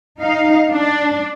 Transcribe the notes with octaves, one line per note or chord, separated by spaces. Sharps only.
D#4 F5
D4